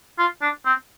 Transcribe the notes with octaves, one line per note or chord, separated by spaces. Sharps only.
F4
D4
C4